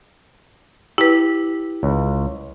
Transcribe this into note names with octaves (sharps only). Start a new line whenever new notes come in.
E4 G4 B4
C#2